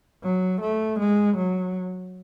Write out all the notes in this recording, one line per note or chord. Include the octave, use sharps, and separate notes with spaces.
F#3
A3
G#3
F#3